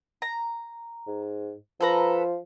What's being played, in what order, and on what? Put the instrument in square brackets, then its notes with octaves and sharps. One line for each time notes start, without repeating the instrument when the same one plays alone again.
[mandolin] A#5
[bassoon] G#2
[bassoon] F3 [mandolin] A4 B4 A#5